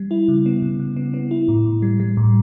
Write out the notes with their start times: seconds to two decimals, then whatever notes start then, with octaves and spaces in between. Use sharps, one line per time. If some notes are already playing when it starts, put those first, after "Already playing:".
Already playing: G3
0.11 E4
0.28 C#3
0.46 B3
0.62 C#3
0.80 C#3
0.96 B3
1.14 B3
1.31 E4
1.48 A2
1.65 A2
1.82 G3
2.00 G3
2.17 A2